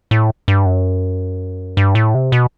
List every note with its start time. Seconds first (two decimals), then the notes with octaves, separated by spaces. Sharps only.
0.11 A2
0.48 G2
0.66 F#2
1.77 G2
1.95 A2
2.14 C3
2.32 B2